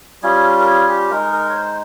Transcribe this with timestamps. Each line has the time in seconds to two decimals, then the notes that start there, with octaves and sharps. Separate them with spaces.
0.22 G3 C#4 F4 G#4
0.60 A#4
0.67 G#4
0.88 G4
1.10 G#3 D#4 A#4
1.33 A#4
1.50 C#5
1.55 C5